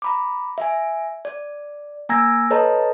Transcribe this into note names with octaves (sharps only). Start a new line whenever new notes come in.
A#5 B5 D6
E5 G#5
D5
A#3 G#5 A#5 E6 G#6 A#6
A4 B4 C#5 D#5 A5 A#5